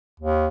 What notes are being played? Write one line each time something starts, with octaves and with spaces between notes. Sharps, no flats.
D#2